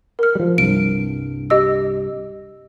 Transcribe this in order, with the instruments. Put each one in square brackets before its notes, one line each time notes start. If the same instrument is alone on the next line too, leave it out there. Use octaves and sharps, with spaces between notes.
[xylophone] A#4 F6
[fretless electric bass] F3 G3
[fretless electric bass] C2 G2 [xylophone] D7
[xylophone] G4 D#5 E6